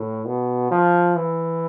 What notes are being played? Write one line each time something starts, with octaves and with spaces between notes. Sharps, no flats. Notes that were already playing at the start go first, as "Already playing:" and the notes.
Already playing: A2
B2
F3
E3